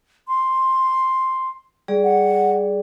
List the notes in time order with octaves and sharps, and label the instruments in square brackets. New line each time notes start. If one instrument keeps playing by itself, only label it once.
[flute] C6
[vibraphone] G3 G#4 D5
[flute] F#5